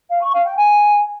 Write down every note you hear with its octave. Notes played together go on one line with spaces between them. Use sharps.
F5
C#6
F5
G5
G#5